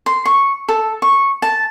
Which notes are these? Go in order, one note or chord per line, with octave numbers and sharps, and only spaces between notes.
C6
C#6
A4
C#6
A5